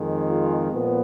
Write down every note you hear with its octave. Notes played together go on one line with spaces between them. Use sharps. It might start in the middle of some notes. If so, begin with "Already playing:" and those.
Already playing: F2 D#3 G#3
F4 G#4
A#2 F3 B3